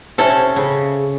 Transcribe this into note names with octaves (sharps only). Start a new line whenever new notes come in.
C3 C#4 A4
C#3